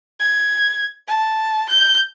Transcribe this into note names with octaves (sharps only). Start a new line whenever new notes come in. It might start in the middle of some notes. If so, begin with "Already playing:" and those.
G#6
A5
G6